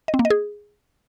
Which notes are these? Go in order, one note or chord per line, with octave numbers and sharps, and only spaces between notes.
D#5
C4
A#3
D#5
G#4